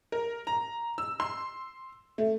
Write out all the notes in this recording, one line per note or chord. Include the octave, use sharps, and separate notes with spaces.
A#4
A#5
E6
C6
A3